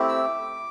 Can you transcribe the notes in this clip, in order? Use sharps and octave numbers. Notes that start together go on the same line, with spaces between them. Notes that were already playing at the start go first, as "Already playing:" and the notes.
Already playing: A3 C4 E4 G4
E6
D6